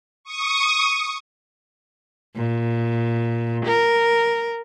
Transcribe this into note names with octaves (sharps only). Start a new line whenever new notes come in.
C#6 D#6
A#2
A#4